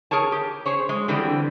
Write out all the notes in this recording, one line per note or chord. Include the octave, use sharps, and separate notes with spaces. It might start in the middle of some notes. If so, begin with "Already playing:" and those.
G#4 A#4 C#5 A5
G4
G#4 C5 C#5
G#3
D3 E3 G3 C4